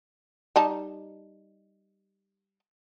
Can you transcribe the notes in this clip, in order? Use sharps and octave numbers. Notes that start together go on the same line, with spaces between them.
G3 D#4 A5